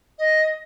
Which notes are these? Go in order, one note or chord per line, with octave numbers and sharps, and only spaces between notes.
D#5